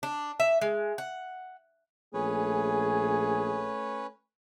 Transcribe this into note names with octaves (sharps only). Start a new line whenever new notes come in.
D4
E5
G#3
F#5
A#1 A3 C#4 G#4 B4 C#5